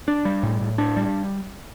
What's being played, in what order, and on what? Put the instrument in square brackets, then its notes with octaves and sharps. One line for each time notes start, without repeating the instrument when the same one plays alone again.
[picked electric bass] D4
G3
A2
A2
D4
G3